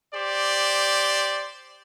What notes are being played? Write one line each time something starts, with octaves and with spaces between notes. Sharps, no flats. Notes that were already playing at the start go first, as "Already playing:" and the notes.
G4 C5 D5